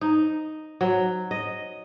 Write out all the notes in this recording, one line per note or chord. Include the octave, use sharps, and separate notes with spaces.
D#4
F#3
D#5